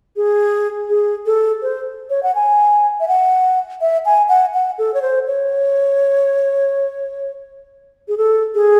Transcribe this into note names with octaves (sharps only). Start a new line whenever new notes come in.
G#4
G#4
A4
C5
C#5
F#5
G#5
E5
F#5
E5
G#5
F#5
F#5
A4
C#5
C5
C#5
G#4
A4
G#4